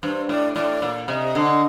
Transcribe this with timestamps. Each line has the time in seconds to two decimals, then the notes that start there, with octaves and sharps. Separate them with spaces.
0.03 G2 C5
0.29 A2 D5
0.55 A2 D5
0.82 A#2
1.08 C3 D#5
1.35 D3